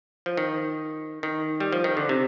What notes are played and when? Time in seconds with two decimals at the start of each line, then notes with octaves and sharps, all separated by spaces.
0.26 F3
0.37 D#3
1.23 D#3
1.60 G3
1.72 F3
1.84 D#3
1.97 D3
2.09 C3